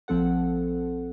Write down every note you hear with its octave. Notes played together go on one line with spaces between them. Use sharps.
A#1 F3 C4 A4 F#5